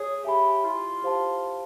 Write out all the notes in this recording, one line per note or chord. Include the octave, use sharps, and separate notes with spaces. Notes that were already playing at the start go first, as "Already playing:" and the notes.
Already playing: G#4 C#5
G4 E5 G#5 B5
E4 F4
G4 C5 F5 A5